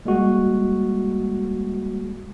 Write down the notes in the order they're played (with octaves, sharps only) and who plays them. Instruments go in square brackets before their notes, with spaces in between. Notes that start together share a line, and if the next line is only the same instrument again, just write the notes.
[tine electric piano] G3 G#3 A#3 F#4